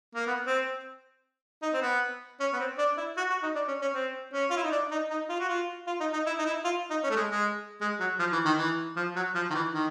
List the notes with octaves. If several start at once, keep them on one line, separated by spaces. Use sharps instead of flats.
A#3
B3
C4
D#4
C4
B3
C#4
B3
C4
D4
E4
F#4
F#4
D#4
D4
C#4
C#4
C4
C#4
F4
E4
D#4
D4
D#4
D#4
F4
F#4
F4
F4
D#4
D#4
E4
D#4
E4
F4
D#4
C#4
A3
G#3
G#3
G#3
F#3
F3
E3
D#3
E3
F3
F#3
F3
D#3
E3
D#3